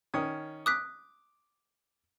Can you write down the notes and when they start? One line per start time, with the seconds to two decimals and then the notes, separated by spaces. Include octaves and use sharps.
0.14 D#3 C#4 D#6
0.66 D6 D#6 F#6 B6